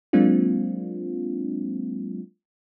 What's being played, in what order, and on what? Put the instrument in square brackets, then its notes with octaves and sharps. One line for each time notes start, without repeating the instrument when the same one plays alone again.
[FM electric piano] F#3 G#3 A#3 C4 D4 F4